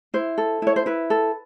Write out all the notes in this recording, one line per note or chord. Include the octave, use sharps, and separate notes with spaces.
E4 C5
A4
E4 C#5
C5
E4 B4
A4